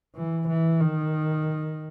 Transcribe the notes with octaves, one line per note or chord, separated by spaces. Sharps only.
E3
E3
D#3